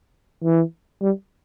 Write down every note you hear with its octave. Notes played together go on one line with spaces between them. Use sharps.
E3
G3